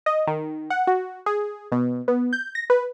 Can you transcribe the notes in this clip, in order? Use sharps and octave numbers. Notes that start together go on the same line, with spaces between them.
D#5
D#3
F#5
F#4
G#4
B2
B3
G6
A#6
B4